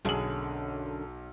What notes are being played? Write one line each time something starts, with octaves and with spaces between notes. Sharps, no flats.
B1 F#2 D3 G#4 F#7